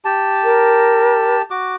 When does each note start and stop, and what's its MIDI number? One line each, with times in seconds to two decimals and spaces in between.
0.05 1.42 67
0.05 1.42 81
0.44 1.37 70
1.51 1.76 66
1.51 1.76 86